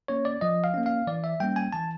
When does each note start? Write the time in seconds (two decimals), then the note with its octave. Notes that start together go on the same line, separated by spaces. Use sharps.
0.08 A#3 C#4 C#5
0.25 D5
0.41 F3 D#5
0.64 F5
0.74 A#3 C#4
0.86 F5
1.07 E3 D5
1.24 E5
1.40 G3 A#3 C#4 G5
1.56 G#5
1.73 E3 A5